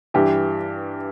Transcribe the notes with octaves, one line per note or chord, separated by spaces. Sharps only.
G2 E3 G4